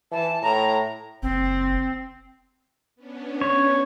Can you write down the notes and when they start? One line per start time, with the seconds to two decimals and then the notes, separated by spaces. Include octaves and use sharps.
0.12 E3 A5
0.42 A2 A#5
1.22 F#1 C4
2.96 B3 C#4 D4
3.41 C#5